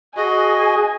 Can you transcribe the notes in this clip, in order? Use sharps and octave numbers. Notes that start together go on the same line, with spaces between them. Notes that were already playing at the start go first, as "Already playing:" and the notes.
F#4 G#4 D#5 G#5